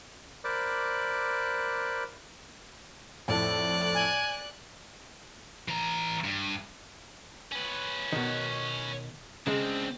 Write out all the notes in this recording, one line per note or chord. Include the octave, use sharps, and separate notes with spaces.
A#4 C5 D5 B5 D6 F#6
F2 A2 A4 D5 F#6
G#5
E3 A#5
G2
C#4 B4
B2 D#3
C#3 G#3 C4 D4